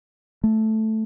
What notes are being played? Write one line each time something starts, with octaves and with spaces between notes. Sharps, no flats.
A3